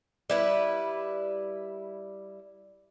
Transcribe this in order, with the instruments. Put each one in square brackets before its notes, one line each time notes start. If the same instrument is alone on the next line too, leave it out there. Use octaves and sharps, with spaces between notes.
[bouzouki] G3 E4 B4